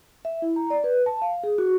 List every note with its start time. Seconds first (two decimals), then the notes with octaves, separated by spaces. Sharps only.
0.25 E5
0.42 E4
0.56 A#5
0.70 D5
0.84 B4
1.06 A5
1.22 F5
1.43 G#4
1.58 F#4